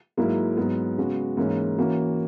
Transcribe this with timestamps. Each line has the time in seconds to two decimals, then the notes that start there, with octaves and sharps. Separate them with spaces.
0.17 G#2 F#3 A#3 E4
0.57 G#2 F#3 B3
0.98 C#3 G#3 B3 F#4
1.37 G#2 E3 A#3 C#4
1.78 E3 A#3 C#4 F#4